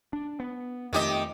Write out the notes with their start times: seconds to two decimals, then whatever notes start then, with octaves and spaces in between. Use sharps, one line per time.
0.13 D4
0.40 B3
0.93 F2 D#3 A3 G4 D#5